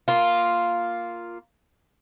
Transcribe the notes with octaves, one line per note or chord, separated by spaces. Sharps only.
A#3 F4